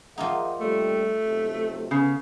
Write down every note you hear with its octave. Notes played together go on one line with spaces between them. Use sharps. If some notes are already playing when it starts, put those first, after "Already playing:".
F3 A#3 D#4 G#4 E5 F#5
A#1 C3 G3 A3
B1 F2 C3
C#3 B3